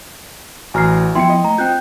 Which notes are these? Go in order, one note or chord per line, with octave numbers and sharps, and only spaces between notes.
A1 F#4 G#5 A#5 F6 C7
F3 B3 E4 G5 C6 C#7
D#5
A3 A#5
C4 F4 G5 F#6 G6